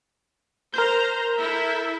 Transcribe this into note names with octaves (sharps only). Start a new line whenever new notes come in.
A#4 C5 A#5 G6
E4 A4 E5